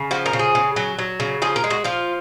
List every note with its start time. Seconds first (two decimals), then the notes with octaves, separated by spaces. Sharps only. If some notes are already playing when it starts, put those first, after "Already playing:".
Already playing: C#3
0.11 F3 F#4
0.26 A#4
0.33 C#3
0.39 G#4
0.55 C#3
0.76 F#3
0.99 F#3
1.20 C#3
1.42 F3 G#4
1.56 A#4
1.64 G#3
1.70 F#4
1.84 F3 F4